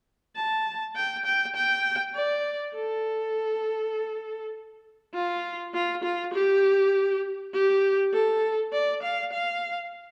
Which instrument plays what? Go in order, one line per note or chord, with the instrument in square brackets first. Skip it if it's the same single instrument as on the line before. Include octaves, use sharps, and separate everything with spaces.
[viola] A5
G5
G5
G5
D5
A4
F4
F4
F4
G4
G4
A4
D5
F5
F5